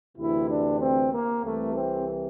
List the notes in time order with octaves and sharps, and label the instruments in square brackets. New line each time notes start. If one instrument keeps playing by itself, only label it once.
[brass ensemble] D2 C3 E3 E4
D4
C4
A#3
C2 C3 E3 A3
C4